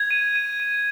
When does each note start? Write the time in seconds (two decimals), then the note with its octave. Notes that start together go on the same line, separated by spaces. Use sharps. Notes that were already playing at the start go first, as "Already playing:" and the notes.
Already playing: G#6
0.11 D#7
0.36 D#7
0.60 D#7